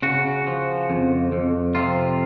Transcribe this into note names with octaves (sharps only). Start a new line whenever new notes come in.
C#3 F#4
F3
F2
F2
C3 F4